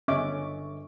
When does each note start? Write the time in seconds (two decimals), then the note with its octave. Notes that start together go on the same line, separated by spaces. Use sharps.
0.08 G1 C#4 D#5 E5 C#6 D6